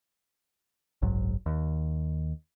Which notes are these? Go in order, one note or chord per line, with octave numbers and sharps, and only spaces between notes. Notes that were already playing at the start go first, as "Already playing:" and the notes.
F#1 B1 G#2 F#3
D#2